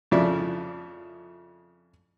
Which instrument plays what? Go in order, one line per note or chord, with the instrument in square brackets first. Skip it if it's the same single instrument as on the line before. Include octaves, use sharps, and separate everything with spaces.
[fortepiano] F2 C#3 F3 E4 D5 E5